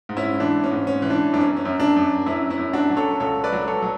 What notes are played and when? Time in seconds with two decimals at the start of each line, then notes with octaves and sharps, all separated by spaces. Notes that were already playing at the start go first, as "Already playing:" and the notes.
0.09 G#2
0.17 C#4 E4
0.40 E3 D4
0.64 C#4
0.71 G#2
0.87 C#4
1.02 E3
1.10 D4
1.33 F#2 D4
1.41 C#4
1.57 C#4
1.65 F#2
1.80 D4
1.96 F#2
2.26 F#2 C#4 E4
2.50 C#4 E4
2.58 F#2
2.73 D4 F#4
2.90 F#3
2.97 A4 C#5
3.20 C#2 A4 C#5
3.44 B4 D5
3.52 F#3
3.67 A4 C#5
3.82 F#3